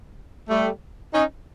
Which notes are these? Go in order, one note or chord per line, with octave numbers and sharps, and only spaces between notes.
G3 A3
C#4 D#4